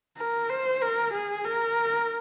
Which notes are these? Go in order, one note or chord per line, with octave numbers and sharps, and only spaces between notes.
A#4
C5
A#4
G#4
A#4